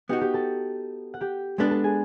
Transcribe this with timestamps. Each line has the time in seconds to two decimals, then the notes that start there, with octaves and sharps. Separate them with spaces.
0.09 B3 D#4 F#4 G4 G5
0.21 G4 G5
0.34 A4 A5
1.14 F#5
1.21 G4 G5
1.58 G#3 B3 D4 A4 A5
1.71 A4 A5
1.83 G#4 G#5